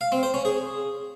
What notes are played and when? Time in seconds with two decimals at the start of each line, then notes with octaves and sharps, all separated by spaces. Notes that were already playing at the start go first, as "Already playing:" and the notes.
0.01 F5
0.12 C4
0.23 C5
0.34 C#4
0.45 G#4